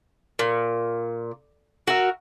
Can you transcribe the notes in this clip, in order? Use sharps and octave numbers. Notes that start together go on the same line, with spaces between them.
A#2
F#4 A#4 E5